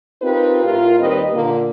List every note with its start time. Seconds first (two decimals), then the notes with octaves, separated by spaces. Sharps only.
0.22 C4 D#4 F4 G4 A#4 B4
0.64 A2 F4 A#4
0.99 D#2 G3 C4 A#4 B4 D#5
1.33 A#2 D3 A#3